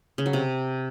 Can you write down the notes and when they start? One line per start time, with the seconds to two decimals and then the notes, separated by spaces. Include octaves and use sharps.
0.18 C#3
0.26 F#3
0.33 C3